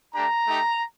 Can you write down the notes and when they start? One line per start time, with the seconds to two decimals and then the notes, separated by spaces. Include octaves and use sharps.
0.14 A3 D4 G4 A#5
0.47 A3 D#4 G4